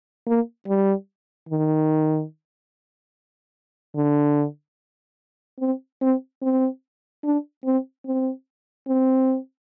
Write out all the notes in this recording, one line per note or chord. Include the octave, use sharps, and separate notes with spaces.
A#3
G3
D#3
D3
C4
C4
C4
D4
C4
C4
C4